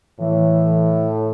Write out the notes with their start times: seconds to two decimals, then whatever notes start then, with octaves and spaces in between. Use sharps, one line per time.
0.19 A2 E3